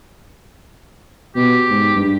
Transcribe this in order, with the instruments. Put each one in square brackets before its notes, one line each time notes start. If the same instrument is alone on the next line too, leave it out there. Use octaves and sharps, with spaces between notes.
[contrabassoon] B2 [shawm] G4
[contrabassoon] G#2
G2